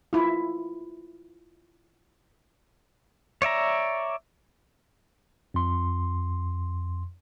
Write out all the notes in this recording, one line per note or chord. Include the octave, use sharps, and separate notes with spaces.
E4 F4
C#5 D5 E5 A#5
F2 C6